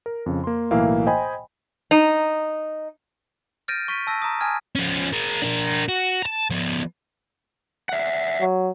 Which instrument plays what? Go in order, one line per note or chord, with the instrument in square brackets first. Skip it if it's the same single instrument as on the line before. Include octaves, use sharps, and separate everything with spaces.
[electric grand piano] A#4
F2 C#3
A#3 C6
B1 A2 E3 A#3 E5 F5
C5 D#5 G5 G#5 B5
[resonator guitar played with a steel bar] D#4
[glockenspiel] F6 G6 A6 A#6 D7 D#7
C#6 B6 D#7
A5 E6 A#6
A#5 D#6
G#5 A5 D#6 F6 G#6
[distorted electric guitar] F3 C#4
G#4 A#4
D4 A#4
F#4
A5 A#5
F3 B3
[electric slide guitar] E5 F#5
[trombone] F#3